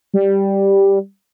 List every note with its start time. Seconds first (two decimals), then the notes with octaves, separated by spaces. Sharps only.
0.14 G3